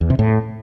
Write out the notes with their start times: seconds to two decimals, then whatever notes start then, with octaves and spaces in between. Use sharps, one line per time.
0.01 E2
0.10 C3
0.19 A2